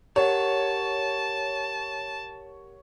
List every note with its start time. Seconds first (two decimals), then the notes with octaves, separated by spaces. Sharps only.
0.16 G4 A#4 C#5 F#5 A5